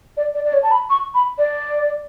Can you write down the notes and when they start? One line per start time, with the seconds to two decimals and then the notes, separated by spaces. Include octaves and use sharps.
0.17 D5
0.34 D5
0.45 D5
0.53 C#5
0.63 A5
0.71 B5
0.90 C#6
1.14 B5
1.38 D5